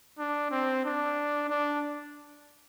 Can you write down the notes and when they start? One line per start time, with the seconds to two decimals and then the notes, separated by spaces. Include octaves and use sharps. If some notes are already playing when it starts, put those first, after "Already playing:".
0.19 D4
0.51 C4
0.85 D4
1.50 D4